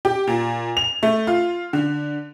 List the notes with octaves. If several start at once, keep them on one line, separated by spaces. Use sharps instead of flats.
G4
A#2
F7
A3
F4
D3